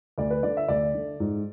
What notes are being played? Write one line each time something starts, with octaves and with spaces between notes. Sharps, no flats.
D2 D5
B4
D3 D5
E5
D2 D5
D3
G#2